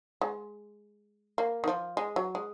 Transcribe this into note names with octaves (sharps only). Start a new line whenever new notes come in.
G#3
A#3
D#3
F3
G#3
F#3
G#3